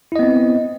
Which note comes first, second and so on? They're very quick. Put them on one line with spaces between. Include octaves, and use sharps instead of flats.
E4 D#5 B3 C4